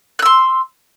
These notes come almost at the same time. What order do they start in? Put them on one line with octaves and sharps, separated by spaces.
F#6 E6 C6